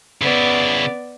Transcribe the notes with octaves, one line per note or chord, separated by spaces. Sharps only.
C#3 B3 E4 D5